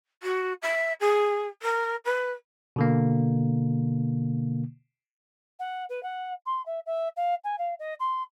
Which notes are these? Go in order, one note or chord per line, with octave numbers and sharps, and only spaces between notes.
F#4
E5
G#4
A#4
B4
B2 D3 A#3
F#5
B4
F#5
C6
E5
E5
F5
G#5
F5
D#5
C6